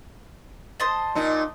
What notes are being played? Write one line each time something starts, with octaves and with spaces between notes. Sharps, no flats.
C5 D#5 A5
A#2 D#4